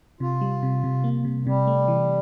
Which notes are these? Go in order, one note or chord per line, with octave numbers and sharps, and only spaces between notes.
C3 F4
G3
C3
C3
A#3
C3
C3 G3
A3
E3